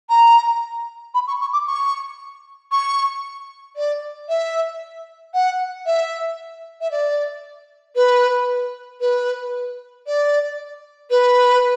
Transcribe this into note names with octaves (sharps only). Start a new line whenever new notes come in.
A#5
B5
C#6
C#6
D6
C#6
C#6
D5
E5
F#5
E5
E5
D5
B4
B4
D5
B4